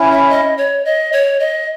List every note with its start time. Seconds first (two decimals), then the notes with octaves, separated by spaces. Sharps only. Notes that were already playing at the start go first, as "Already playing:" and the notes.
Already playing: C#4 E4
0.12 E5
0.30 D#5
0.58 C#5
0.85 D#5
1.13 C#5
1.40 D#5